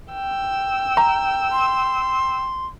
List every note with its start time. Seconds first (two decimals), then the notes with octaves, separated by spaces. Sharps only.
0.13 G5 E6
0.97 A#5
1.52 C6